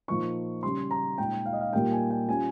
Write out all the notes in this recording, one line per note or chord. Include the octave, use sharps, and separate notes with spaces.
A#2 F3 A#3 D#4 C#6
C#3 G3 C#4 C6
A#5
A#2 G#3 D#4 G5
F5
D#5
F5
A#2 G3 A#3 D#4 G5
G#5
G5
G3 C#4 F4 G#5